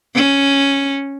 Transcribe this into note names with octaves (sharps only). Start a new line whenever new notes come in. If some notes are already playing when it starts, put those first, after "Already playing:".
C#4